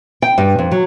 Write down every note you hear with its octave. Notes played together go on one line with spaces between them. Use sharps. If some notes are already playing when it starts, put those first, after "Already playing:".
G5
G2
F2
F#3